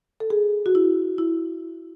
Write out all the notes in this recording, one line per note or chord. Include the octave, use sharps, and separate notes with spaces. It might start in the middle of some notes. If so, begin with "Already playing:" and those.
A4
G#4
F#4
E4
E4